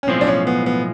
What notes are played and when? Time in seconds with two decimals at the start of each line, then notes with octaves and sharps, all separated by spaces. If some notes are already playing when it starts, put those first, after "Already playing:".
0.03 C#4
0.07 B1 A2 F3 G#3 C4
0.21 D4
0.27 C#4
0.47 B3
0.66 B3